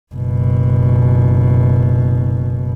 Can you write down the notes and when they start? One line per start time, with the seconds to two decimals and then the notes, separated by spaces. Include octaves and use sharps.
0.15 F#1 B2